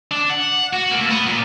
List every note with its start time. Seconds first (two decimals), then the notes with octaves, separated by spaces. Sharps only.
0.11 D4
0.30 F#5
0.73 F#4
0.91 A3 A#3
1.10 B3
1.26 A#2